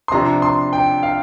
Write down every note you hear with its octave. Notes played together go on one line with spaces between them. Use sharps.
C6
C3 F3 D4 A#5
C6
G5
F5